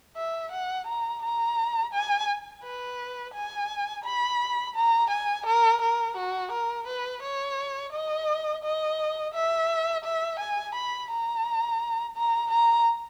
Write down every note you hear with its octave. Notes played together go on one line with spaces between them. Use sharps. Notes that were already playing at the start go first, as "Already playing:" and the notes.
E5
F#5
A#5
A#5
G#5
B4
G#5
B5
A#5
G#5
A#4
A#4
F#4
A#4
B4
C#5
D#5
D#5
E5
E5
G#5
B5
A#5
A#5
A#5